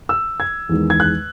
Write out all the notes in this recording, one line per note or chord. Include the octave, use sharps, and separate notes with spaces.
E6
G#6
E2 D#3 G#3
G#6
F#6